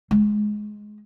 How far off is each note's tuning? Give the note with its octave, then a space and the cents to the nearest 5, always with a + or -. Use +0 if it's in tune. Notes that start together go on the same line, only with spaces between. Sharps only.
G#3 +15